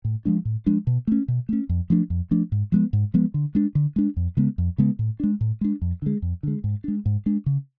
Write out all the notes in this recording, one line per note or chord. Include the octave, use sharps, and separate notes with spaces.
A2
F3 G#3 D4
A2
F3 G#3 D4
B2
A3 C#4
B2
A3 C#4
F2
F3 A3 D4
F2
F3 A3 D4
G#2
F3 G#3 B3
G#2
F3 G#3 B3
D3
G#3 D4
D3
G#3 D4
F2
C#3 G#3 B3
F2
C#3 G#3 B3
A2
G#3 D4
A2
G#3 D4
F2
D3 G#3
F2
D3 G#3
G#2
G#3 D4
G#2
G#3 D4
C#3